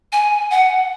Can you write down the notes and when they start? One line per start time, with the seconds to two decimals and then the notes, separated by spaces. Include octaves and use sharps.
0.12 G#5
0.51 F#5